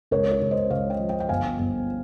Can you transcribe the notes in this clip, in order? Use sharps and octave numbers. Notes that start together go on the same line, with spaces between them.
C#2 A#4 C#5
A#4 C#5
C#2
C5 D#5
C#2 C#5 F5
D#5 G5
F3
D#5 G5
G5
G1 F5 G#5
G1